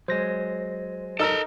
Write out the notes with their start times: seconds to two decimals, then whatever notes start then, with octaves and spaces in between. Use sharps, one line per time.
0.08 F#3 G#3 C5 A#6
1.19 D#4 A4 A#4 A#5 E6